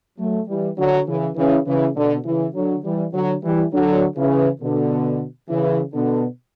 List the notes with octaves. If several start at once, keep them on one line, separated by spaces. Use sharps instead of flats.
F#3 A3
E3 G3
D3 F#3
C#3 E3
C#3 E3
C#3 E3
B2 D3
C#3 E3
D3 F#3
E3 G3
D3 F#3
E3 G3
D3 F#3
C#3 E3
B2 D3
C#3 E3
B2 D3